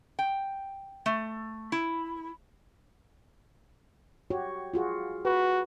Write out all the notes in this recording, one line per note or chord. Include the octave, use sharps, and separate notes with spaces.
G5
A3
E4
F#4 G4 C#5
F4 F#4 G#4
F#4 B4